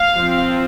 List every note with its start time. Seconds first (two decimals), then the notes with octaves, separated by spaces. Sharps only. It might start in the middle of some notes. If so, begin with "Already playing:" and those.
Already playing: F5
0.16 F3 C4